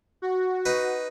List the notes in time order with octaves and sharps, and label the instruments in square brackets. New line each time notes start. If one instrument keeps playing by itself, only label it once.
[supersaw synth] F#4
[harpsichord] D#4 B4